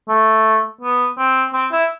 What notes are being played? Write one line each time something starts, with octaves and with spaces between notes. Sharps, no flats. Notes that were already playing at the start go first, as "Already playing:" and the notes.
A3
B3
C4
C4
E4